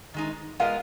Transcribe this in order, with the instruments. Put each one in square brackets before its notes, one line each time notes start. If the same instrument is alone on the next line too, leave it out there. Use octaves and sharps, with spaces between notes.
[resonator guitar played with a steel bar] D#3 G#3 D#4
[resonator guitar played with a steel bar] G#3 B3 F4 A#4 D#5 [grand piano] F5